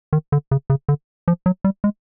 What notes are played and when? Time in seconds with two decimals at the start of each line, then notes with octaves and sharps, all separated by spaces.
0.13 D#3
0.32 D3
0.51 C#3
0.70 C#3
0.89 D3
1.28 F3
1.46 F#3
1.64 G3
1.84 G#3